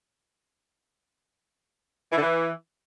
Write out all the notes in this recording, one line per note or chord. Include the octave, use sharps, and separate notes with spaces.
E3
D3
E3